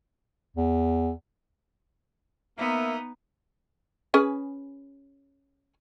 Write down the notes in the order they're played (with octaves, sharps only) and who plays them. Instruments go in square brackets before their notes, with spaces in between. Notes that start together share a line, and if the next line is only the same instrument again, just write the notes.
[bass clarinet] E2
[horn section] A#3 E5 [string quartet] B3 D#4
[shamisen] C#4 G#4 B4